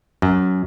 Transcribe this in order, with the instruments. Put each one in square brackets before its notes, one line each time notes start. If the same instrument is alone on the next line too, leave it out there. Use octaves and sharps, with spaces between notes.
[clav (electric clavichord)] F#2